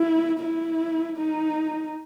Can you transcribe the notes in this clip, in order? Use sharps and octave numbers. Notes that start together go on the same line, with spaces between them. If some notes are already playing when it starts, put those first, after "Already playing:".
Already playing: E4
E4
D#4